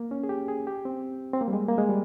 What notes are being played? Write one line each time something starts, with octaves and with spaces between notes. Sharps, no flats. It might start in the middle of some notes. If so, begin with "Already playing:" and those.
Already playing: A#3
C#4
G#4
G4
G#4
G4
C4
C4
A#3
G3
G#3
A#3
G#3
G3